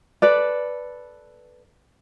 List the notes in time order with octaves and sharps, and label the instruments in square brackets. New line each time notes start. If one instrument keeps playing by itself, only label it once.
[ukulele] A4 B4 D5